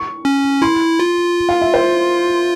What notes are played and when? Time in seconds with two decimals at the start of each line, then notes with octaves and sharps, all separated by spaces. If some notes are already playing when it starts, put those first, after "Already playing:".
Already playing: C#6
0.25 C#4
0.62 E4 C6
1.00 F4
1.49 F5
1.62 E5
1.74 C5